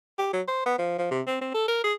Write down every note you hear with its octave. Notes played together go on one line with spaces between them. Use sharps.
G4
F#3
C5
B3
F3
F3
C3
C4
C4
A4
A#4
G#4